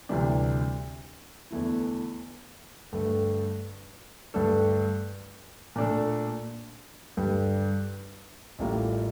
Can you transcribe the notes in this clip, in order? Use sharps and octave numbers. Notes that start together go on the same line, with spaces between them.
D2 C3 E3 G3 D4
E2 D3 A3 E4
G2 D3 A3
G2 D3 A3 D4 A4
A#2 A3 D4 A4
G2 D3 G3
A1 A2 G3 A#3 F4